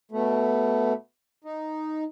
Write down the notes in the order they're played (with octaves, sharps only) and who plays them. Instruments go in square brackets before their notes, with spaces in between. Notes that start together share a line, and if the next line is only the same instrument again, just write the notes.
[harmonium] B2 A3
D#4